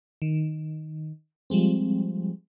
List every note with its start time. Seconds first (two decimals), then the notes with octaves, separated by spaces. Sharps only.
0.22 D#3
1.50 F3 G3 G#3 C4